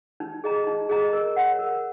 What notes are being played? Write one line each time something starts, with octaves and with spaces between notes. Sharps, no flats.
D#4
G#4 D#5 A#5
D#4
G#4 D#5 A#5
A#4
C#5 F#5
A#4